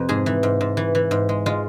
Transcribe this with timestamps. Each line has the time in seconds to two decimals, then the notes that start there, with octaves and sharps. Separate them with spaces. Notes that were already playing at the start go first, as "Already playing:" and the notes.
Already playing: F2 C3 F3 B4
0.09 G#2 G#4
0.26 E3
0.43 G#2
0.61 G#2
0.77 E3
0.95 E3
1.11 G#2
1.29 G#3
1.46 G#3 F4